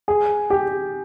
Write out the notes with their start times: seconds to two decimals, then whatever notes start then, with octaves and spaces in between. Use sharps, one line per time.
0.08 G#4
0.50 G4